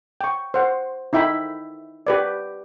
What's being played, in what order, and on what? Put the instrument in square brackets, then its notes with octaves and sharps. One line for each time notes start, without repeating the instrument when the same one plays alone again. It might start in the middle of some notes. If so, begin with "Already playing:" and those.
[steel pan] G5 C#6
C5 F#5
D#4 E4 E5 G5 B5
G4 B4 D5